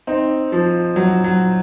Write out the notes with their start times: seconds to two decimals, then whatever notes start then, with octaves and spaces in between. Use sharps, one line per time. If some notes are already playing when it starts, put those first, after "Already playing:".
0.07 C4 D#4
0.52 F3
0.96 F#3
1.24 F#3